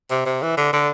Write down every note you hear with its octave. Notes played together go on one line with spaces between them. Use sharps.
C3
C3
E3
D3
D3